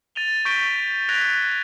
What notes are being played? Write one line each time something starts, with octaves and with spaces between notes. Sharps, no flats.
A6 D#7 F7 G7
C#6 G6 A#6 B6 D7 G7
F#6 G#6 A#6 B6 D7 F7